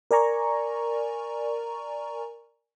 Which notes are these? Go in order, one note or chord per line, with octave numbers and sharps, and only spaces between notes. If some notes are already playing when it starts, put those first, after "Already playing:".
A#4 D5 G#5 A#5 C#6